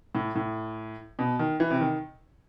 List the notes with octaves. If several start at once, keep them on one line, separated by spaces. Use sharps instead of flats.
A2
A2
B2
D#3
E3
C3
D#3